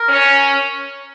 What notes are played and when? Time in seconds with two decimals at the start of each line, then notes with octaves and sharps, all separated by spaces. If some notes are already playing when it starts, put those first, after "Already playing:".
Already playing: A#4
0.09 C#4